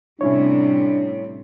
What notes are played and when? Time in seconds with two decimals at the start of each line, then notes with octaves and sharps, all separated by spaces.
0.21 A2 C3 G3 C#4 D4 E4 C#5